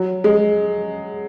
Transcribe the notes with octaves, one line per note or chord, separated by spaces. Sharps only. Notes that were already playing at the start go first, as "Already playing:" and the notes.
Already playing: F#3
G#3